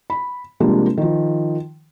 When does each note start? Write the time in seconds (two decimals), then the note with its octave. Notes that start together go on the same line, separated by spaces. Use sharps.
0.10 B5
0.60 C3 F3 G3 G#3 A#3 D4
0.97 D#3 F3